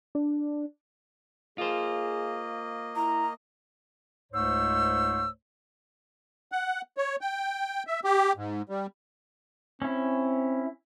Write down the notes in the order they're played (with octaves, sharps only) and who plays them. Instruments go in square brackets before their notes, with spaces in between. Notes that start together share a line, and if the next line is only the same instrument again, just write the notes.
[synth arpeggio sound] D4
[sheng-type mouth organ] A#3 D#5 [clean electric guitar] F4 C5 [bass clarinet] G#4
[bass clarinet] E4 [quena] A#5
[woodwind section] C#2 G#2 A3 C5 C#5 E6
[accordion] F#5
C#5
G5
E5
G4
G#2
G3
[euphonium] C4 [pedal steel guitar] C#4 E4